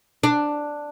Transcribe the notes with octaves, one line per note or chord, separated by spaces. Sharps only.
D4